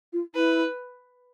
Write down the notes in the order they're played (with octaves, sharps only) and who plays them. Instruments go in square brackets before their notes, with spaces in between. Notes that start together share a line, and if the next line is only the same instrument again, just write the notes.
[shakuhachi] F4
[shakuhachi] E4 [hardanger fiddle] B4